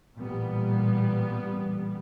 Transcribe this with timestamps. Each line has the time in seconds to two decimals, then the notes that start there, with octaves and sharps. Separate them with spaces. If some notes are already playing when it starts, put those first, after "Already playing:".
0.17 A1 A#2 G3 B3